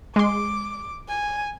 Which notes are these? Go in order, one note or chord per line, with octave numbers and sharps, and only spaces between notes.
G#3 C6 D6
G#5